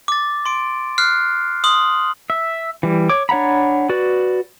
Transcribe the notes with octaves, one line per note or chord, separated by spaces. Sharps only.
D6 A6
C6 D7
F6 F#6 C7
C6 D#6 F#7
E5
E3 G3
C#5 D6
D4 C#5 F#5 A#5 B5
F#4 B4 D5